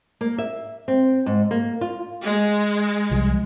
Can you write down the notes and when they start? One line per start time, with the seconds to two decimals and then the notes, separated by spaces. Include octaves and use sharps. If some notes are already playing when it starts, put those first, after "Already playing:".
0.21 A#3
0.38 E5
0.88 C4
1.26 G#2
1.51 A#3
1.81 F4
2.24 G#3
3.11 C2 F3 G3